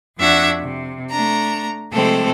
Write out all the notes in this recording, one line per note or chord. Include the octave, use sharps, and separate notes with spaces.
F2 D4 F#4 E5 F#5 G#6
C3
A3 D4 A#5
C3 F3 G#3 A3 C4 A4